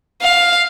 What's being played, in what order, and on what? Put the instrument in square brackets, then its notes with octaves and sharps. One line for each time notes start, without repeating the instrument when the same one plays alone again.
[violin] F5